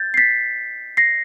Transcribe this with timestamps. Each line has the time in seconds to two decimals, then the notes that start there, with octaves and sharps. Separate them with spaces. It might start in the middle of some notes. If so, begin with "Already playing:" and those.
Already playing: G6 A6
0.14 C7
0.18 A6 B6
0.97 A#6 C7